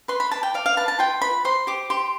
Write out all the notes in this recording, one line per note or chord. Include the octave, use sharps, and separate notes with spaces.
B4 C6
B5
D5 A5
G5
D5 F5
F5
B4 A5
A5
F4 G5
B4 B5
C5 C6
G4 D6
G4 C6